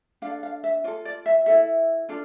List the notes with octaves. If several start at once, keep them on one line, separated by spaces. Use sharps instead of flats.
D4 A4 F5
F5
E5
F4 A4 D5
D5
E5
E4 A4 E5
D4 F4 A4